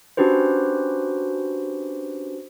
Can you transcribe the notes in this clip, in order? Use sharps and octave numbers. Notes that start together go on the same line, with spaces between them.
C#4 D4 F#4 G4 B4 C5